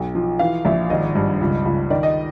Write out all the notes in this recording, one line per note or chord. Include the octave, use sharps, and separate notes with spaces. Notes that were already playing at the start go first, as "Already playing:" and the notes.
Already playing: B1
F3
E3 F5
A#1 E5
G#1 D#5
G2
C#2
C#2
D#3 D5
D#5